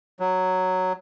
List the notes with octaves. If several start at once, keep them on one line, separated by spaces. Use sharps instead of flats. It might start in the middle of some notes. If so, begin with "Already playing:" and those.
F#3